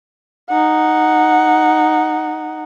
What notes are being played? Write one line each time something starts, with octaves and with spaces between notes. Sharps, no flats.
D#4 F#5